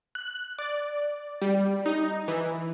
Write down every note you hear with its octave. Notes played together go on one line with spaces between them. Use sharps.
F#6
D5
G3
D#4
E3